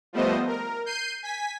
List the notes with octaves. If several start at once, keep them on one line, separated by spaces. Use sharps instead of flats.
F3 G3 A3 B3 C5 D#5
A#4
G6 C7 D#7
G#5 B6